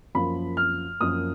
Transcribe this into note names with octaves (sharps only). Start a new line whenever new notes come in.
F#2 F3 A#3 B5
F6
F#2 F3 A#3 D#6